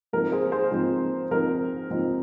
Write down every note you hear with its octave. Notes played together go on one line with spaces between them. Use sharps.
G#2 F3 C4 D#4 A#4
G#4 C5
G#4 C5
G#2 F3 C4 D#4
G#2 F3 C4 D#4 A#4
G#2 F3 C4 D#4